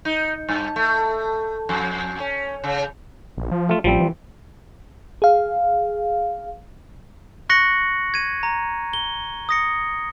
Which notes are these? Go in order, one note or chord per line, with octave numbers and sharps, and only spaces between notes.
D#4
G2
A3
F2
C#4
C#3
A#1
F3
A3 F4
A1 F3 G3 C4
E3
G#4 F5
C#6 F#6 A#6 C#7 F#7
G#6 D#7
A#5
G7
D#6 A#6 C#7